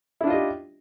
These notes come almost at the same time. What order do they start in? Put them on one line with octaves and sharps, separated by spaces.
E4 D4 F4 D#5 G4